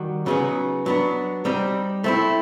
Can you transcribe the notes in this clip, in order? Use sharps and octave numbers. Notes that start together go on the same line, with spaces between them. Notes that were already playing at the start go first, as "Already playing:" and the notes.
Already playing: D#3 G3 F#4
C#3 F#3 B3 D#4 G#4
F#3 B3 D4
G3 C4 D#4
A3 C4 E4